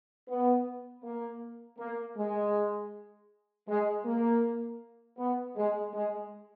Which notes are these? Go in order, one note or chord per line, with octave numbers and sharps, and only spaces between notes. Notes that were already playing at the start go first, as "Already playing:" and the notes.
B3
A#3
A#3
G#3
G#3
A#3
B3
G#3
G#3